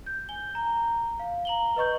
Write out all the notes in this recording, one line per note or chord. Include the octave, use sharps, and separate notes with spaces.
G6
G#5 G7
A#5
F5
A#5 F#7 G7
B4 D#5 C#6 G6